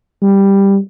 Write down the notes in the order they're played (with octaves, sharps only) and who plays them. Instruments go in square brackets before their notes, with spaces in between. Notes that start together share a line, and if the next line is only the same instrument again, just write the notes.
[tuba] G3